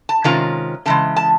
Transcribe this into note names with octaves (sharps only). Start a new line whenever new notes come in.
A5
C3 D#3 G#3 C#4 F4 A#5
C#3 E3 G#3 A5
A5